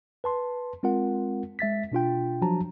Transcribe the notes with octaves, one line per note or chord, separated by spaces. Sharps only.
B4 A5 C6
G#3 C4 F4 A#4 F#5
G#3 E5 A6 B6
B2 D4 F4 G5
F3 F#3 D4 F#4 A5 A#5